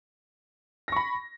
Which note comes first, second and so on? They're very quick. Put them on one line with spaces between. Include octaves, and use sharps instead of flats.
A#6 C#6 B5